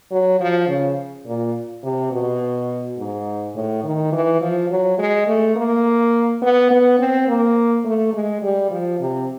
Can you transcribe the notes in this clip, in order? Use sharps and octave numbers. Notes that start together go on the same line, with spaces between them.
F#3
F3
C#3
A#2
C3
B2
G#2
A2
D#3
E3
F3
F#3
G#3
A3
A#3
B3
B3
C4
A#3
A3
G#3
G3
F3
C3